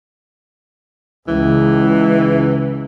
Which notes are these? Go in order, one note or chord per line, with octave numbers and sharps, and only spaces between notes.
C#2 E3